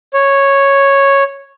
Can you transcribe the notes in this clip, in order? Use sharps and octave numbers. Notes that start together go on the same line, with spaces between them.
C#5